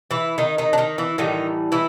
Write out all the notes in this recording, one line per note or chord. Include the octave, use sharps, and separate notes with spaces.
E3 E4
D#3 D#4
D#3 D#4
D4
D#3 D#4
E3 E4
A2 D#3 E3 G3 D#4
E3 E4